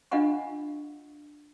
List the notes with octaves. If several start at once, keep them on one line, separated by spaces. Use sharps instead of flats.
D4 F4 D#5 F5 F#5 C#6